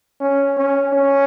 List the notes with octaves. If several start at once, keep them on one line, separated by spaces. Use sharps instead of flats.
C#4
C#4
C#4